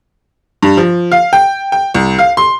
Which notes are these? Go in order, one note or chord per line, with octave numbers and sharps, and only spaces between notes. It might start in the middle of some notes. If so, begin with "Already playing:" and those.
G2
F3
F5
G5
G5
C2
F5
C6